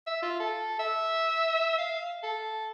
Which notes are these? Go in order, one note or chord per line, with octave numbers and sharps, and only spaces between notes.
E5
F4
A4
E5
F5
A4